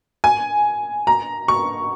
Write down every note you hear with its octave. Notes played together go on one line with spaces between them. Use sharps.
G#5
A#5
C#6